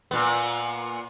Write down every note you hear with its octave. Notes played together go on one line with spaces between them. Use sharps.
A#2 B3